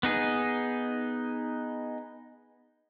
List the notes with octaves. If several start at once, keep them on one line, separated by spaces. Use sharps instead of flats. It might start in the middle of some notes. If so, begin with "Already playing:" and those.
B3 D#4 G#4